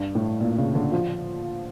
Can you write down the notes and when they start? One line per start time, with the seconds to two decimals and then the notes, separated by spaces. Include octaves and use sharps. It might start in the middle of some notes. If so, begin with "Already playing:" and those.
Already playing: G2
0.15 A2
0.41 A#2
0.58 C#3
0.75 D3
0.92 F3